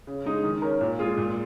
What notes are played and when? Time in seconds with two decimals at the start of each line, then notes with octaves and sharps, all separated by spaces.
0.07 C#3
0.25 G#3 D#4 G#4
0.44 D#3
0.62 C#4 A#4
0.81 A#2
0.99 G#3 F4 G#4
1.18 A#2